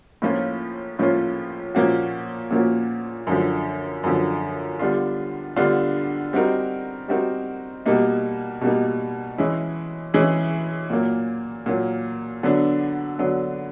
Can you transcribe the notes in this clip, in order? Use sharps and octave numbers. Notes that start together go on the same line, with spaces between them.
A2 F3 A#3 C#4 F4
A2 F3 A#3 C#4 F4
A#2 F3 A#3 C#4 F#4
A#2 F3 A#3 C#4 F#4
F#2 D3 F3
F#2 D3 F3
D3 G3 B3 D4 F4
D3 G3 B3 D4 F4
G3 C4 D#4 F#4 A#4
G3 C4 D#4 F#4 A#4
B2 G3 A#3 D#4
B2 G3 A#3 D#4
E3 G#3 C#4 E4 G#4
E3 G#3 C#4 E4 G#4
A#2 F#3 A#3
A#2 F#3 A#3
D3 F#3 B3 D4
D3 F#3 B3 D4